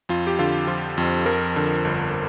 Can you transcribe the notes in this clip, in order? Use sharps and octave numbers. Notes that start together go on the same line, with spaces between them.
F2 F4
G4
D3 F4
F3 F4
F2
F3 A#4
D3
G1